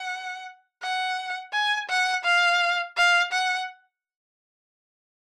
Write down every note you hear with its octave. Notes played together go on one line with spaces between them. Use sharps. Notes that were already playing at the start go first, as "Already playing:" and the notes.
Already playing: F#5
F#5
G#5
F#5
F5
F5
F#5